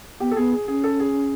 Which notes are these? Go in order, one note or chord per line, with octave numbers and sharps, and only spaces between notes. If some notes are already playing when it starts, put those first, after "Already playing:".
B3 G4
A4
B3 G#4
G#4
C#4 G#4
A4
G#4